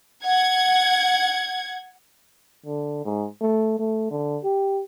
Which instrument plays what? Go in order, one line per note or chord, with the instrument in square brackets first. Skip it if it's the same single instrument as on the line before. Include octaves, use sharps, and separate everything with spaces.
[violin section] F#5 G#6
[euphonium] D3
G#2
A3
A3
D3
G4